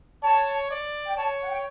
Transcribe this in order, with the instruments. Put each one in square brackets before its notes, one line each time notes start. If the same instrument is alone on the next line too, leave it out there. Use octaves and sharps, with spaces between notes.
[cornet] C#5 [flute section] A5
[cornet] D5
[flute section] G5
[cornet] C#5 [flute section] A5
[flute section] F#5
G5